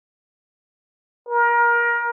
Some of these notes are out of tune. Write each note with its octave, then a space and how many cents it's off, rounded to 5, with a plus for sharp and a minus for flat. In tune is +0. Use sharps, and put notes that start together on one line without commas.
A#4 +25